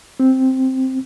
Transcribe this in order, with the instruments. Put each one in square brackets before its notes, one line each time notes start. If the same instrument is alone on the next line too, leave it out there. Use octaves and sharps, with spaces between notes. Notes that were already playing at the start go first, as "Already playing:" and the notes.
[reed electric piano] C4